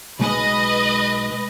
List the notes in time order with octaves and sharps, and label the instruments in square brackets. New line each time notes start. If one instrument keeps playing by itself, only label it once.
[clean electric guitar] B1 G#3 [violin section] B4 D#5